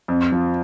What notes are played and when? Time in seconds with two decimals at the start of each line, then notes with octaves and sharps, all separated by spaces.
0.08 F2
0.32 F3